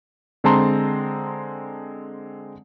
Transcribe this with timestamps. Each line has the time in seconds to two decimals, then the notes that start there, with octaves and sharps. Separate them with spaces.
0.44 D3 G#3 C4 A5 A#5 C6